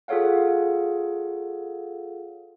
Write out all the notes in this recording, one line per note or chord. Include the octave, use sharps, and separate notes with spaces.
F4 G#4 A4 C#5 F5 F#5